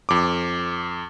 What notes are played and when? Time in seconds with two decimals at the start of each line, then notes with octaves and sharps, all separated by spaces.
0.09 F2 D6